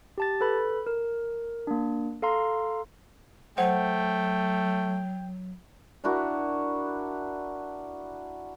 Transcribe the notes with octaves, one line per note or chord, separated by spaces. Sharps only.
G4 A5 A6
A4 B4 B5
A#4
A#3 D4
A4 F5 A#5 C6
F#3 A3 C5 F#5 G5
D4 E4 F#4 A#4